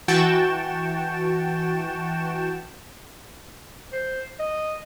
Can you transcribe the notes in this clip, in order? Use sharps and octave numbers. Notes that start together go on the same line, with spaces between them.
E3 F#4 G5 A5 C#6 E7
C5
D#5